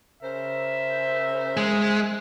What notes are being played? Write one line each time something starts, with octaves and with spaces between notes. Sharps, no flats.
C#3 A#4 C5 E5
G#3